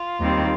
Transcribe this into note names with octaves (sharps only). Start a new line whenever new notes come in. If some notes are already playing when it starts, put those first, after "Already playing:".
Already playing: F4
D#2 D#3 G3 C4